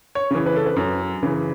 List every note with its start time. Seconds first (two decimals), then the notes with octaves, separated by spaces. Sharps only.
0.15 C#5
0.31 C#3 E3
0.46 B4
0.56 A4
0.66 B4
0.76 F#2
1.23 C#3 E3